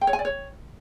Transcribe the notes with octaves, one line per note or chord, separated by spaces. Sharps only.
G5
C#5
G#5
D5
C#5